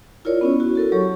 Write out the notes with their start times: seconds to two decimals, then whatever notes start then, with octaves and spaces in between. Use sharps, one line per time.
0.25 E4 F4 A#4 C#5 D5
0.41 B3 C#4 E4
0.60 E4 F#4
0.75 F#4 A4 A#4
0.92 F#3 G4 C#5 C#6